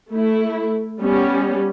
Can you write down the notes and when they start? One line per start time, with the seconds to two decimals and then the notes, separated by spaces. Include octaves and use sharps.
0.11 A3 E4
1.01 G3 B3 C#4